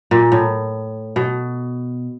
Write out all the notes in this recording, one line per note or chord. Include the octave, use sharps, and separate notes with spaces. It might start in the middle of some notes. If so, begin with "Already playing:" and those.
A#2
A2
B2